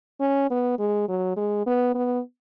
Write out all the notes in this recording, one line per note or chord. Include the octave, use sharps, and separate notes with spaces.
C#4
B3
G#3
F#3
G#3
B3
B3